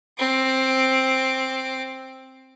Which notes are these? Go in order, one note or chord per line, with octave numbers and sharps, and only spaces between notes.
C4 D6